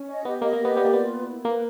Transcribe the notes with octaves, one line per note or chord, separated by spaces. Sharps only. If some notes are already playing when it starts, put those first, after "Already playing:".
Already playing: C#4
D#5
B3 G4
A#3 D#5
A#3
B3 G4
B3 D5
A#3
B3 F4
B4
E4
A#3 B4